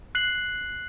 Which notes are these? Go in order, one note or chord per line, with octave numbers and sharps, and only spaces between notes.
F#6 C7 F#7